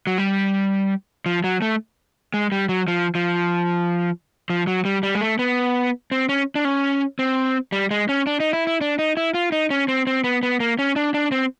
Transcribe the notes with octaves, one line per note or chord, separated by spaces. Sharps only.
F#3
G3
F3
F#3
A3
G#3
G3
F#3
F3
F3
F3
F#3
G3
G3
G#3
A3
B3
C4
C#4
D4
C#4
C4
G3
G#3
C#4
D4
D#4
E4
E4
D4
D#4
E4
F4
D#4
C#4
C4
C4
B3
B3
A#3
C#4
D4
D4
C4